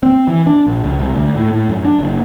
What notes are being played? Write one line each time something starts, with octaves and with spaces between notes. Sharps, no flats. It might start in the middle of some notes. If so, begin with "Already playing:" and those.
C4
E3
D4
A#1
C#2
C2
D2
A2
A2
F#2
D4
F#1